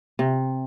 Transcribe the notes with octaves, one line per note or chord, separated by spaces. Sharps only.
C3